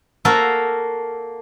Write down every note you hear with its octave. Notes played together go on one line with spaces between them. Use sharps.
A#3 F#4 A4 A#4 F5